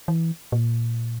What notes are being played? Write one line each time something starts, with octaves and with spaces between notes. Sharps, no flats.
E3
A#2